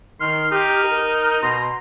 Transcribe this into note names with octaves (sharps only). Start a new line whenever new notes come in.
D#3 C6 F6
D#4 G4
A#4
B2 A#5 C6